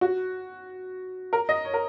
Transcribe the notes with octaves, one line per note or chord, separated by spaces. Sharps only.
F#4
A#4
D#5
C#5
A#4